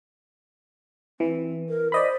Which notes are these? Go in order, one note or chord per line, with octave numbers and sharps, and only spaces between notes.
E3 C4
A#4
C5 D5 D#5 B5